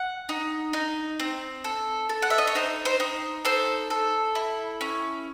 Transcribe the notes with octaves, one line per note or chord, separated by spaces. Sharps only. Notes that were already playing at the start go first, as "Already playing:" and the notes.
Already playing: F#5
D#4
D#4
C4
A4
A4
F#5
E5
D#5
C#5
D#4 C5
C5
D#4
A4 C5
A4
E4
C#4